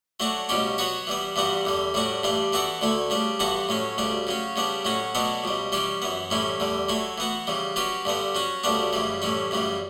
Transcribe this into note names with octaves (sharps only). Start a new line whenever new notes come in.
F#3 A3 D4 F#4
C#2 B2 G3 C#4 G4
F#3 B3 F#4 C#5
E3 G3 B3
G2 E3 G3 B3 F#4
E2 D3 G3
A2 G3 D4 F#4
G2 E3 G3 D4
E3 B3 F#4 A4 D5
D2 D3 A3 E4
C#3 G3 D4
G2 E3 B3 F#4 A4
A2 F#3 C#4
D2 C#3 G3 D4
C#3 F#3 C#4
C#3 G3 B3 D4
A2 F#3 C#4 F#4
B2 F#3 B3 D4 A4
C#2 B2 G3
E3 G3 C#4 G4
F#2 E3 B3
A2 E3 G3 C#4 E4
E2 D3 G3
F#3 A3 E4
E3 B3 F#4
C#3 E3 G3
F#3 C#4 G4 B4
G2 D3 G3 B3
F#3 C#4 F#4
D2 C#3 G3 B3 D4
F#2 C#3 E3 G3
A2 E3 G3 C#4
F#2 C#3 E3 G3